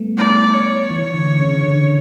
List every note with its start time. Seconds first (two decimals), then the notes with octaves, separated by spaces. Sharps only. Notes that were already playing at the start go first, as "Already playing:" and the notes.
Already playing: G3 A3 B3
0.18 D5
0.54 C#5
0.91 E3
1.14 D3
1.40 C#3
1.63 D3